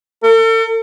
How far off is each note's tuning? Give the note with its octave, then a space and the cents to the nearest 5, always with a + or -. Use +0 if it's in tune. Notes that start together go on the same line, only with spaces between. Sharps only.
A4 +40